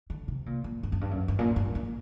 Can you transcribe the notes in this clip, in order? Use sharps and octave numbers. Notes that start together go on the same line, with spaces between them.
D3
C3
A#2
A#2
G2
F#2
G2
F#2
G2
A#2
G2
A#2